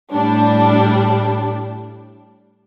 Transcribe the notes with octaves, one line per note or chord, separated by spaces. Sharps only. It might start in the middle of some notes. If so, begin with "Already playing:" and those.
A2 G3 D4